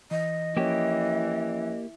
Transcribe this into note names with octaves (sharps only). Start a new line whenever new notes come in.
E3 D#5
E3 F3 A#3 C#4 G4 C#5